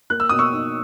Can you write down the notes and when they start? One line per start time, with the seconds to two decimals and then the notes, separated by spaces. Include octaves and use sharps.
0.10 A#3 F#6
0.20 E6
0.29 B2 D#6
0.39 C#6 E6
0.53 D#4